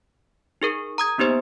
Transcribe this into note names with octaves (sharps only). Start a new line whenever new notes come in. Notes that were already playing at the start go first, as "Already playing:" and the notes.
D#4 G#4 A#4
A#5 D#6 G#6
A#3 B3 D#4 G4 C5